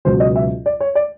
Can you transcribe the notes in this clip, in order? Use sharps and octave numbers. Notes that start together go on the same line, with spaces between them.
C#2 B2 F#3 C5
D#5
E5
D5
C#5
D5